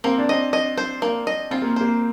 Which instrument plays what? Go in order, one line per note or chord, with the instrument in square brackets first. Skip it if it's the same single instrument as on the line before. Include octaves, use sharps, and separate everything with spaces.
[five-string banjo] A#3 [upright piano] C4
[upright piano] D4
[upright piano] C4 [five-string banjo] D#5
[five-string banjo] D#5
C5
A#3
D#5
[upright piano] C4 [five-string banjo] F4
[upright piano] A#3
[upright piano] A#3 [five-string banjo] C5